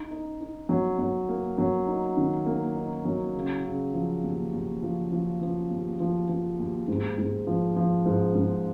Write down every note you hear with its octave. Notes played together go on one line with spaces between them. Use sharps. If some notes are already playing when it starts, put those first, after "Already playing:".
Already playing: D#4
D#4
D#4
F#3
F#3
A#3
F#3
D#4
D#3
A#3
D#4
F#3
C#3
C#3
F3
D#2
D#2
F3
F3
F3
D#2
F3
F3
D#2
G#2
G#2
F3
F3
G#2
G#2